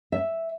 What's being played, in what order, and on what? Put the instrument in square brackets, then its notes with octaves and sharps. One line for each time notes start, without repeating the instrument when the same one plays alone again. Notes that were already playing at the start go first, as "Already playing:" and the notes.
[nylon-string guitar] E5